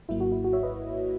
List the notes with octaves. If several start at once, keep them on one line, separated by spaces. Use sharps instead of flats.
G#1 G#2 F#3 A#3 E4
F#4
E4
F#4
C#5 E5
B4 D#5